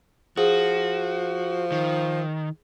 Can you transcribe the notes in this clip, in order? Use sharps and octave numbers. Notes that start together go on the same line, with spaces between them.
F3 F#4 G#4
D#3